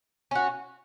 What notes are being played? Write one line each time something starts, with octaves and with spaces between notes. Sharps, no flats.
C#4 F#4